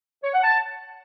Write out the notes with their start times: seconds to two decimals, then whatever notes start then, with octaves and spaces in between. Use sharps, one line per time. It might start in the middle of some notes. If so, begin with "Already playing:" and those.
0.23 C#5
0.34 F#5
0.44 A5